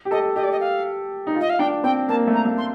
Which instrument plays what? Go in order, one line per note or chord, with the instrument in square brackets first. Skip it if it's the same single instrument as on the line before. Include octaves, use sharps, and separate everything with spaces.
[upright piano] G4
[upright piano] A4 [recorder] D#5
[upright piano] G4 [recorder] D#5
[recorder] D5
D#5
F5
[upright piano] D#4
F4
[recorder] D#5
F5
[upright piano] D4 [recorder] G5
[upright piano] C4 [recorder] G5
[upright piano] A#3 [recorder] A5
[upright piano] A3
[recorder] A#5
[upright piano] A3
[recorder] C6